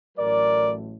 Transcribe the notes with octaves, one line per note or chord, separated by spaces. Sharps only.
A1 A2 F#3 A3 A#4 D5